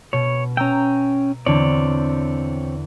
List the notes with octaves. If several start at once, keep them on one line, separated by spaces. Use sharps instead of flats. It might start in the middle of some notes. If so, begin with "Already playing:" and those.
B2 C#5
C#4 G5 A#5 E6
E2 D3 C4 C#5 D5